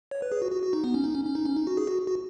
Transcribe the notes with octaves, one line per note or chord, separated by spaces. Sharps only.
C#5
B4
G#4
F#4
F#4
F#4
D#4
B3
C#4
D#4
C#4
C#4
D#4
C#4
D#4
F#4
G#4
F#4
F#4